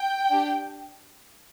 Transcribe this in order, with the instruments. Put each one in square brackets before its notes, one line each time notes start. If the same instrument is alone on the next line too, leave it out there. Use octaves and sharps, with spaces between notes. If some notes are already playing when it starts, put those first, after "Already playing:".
Already playing: [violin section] G5
D4 G4